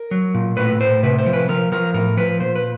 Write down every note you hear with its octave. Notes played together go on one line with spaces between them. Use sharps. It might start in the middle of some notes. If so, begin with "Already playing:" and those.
Already playing: A#4
F#3
A#2
A2 B4
A2 C5
C3 B4
C5
F3
B4
F3 A#4
F3 A#4
A2 A#4
F3 B4
A#2 C5
B4